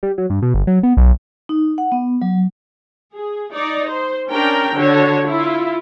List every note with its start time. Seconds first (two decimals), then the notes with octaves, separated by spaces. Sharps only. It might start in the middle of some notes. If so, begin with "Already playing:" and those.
0.03 G3
0.18 F#3
0.30 G2
0.42 B2
0.54 G1
0.67 F#3
0.83 B3
0.97 B1
1.49 D#4
1.78 F#5
1.92 B3
2.22 F#3
3.14 G#4
3.53 D#4 D5
3.89 C5
4.29 C#4 D4 A#4 G5
4.75 D3 F#4 C#5
5.26 E4 F4